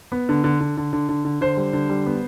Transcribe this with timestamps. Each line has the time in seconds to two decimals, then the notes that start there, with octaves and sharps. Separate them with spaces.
0.12 B3
0.29 D3
0.44 D3
0.60 D3
0.77 D3
0.93 D3
1.09 D3
1.25 D3
1.41 D3 C5
1.57 G3
1.73 D3
1.90 G3
2.06 B3